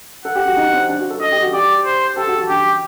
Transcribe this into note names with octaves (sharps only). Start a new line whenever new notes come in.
A4 F#5
G4
F#4
D#4
C4
D4
F#4
A4
A4 D#5
G4
F#4
G4 D5
C5
G4 A4
F#4
F#4
D4 G4